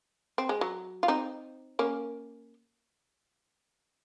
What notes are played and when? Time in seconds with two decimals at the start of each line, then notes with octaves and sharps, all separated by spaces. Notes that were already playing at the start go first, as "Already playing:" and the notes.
0.38 C4
0.49 G#3
0.61 F#3
1.03 F4
1.08 C4 D#4
1.79 A#3 C#4